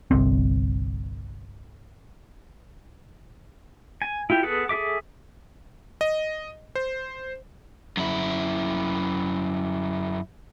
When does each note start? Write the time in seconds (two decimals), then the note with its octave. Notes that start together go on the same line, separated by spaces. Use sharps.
0.11 G1 C2 C4
4.02 G#5
4.30 E4 F4 G4
4.43 B3 G#4 A4 B4 F#5
4.69 G#4 A4 E5 D6
6.01 D#5
6.75 C5
7.97 F#2 E4